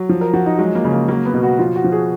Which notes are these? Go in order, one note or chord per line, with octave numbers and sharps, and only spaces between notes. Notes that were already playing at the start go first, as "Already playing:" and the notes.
Already playing: F#3
F3
A#4
F3 F#4
D#4
F#3 G#3
A#3
C#3
A#3
F#3 A#3
B3
B2
F#4
F3 F4
F#4
F3
G#4